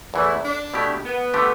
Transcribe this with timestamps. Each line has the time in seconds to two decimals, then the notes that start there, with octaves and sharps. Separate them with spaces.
0.14 E2 E3 A3 E4
0.44 D4
0.74 B2 A3 E4 G4
1.04 B3
1.34 D3 A3 G4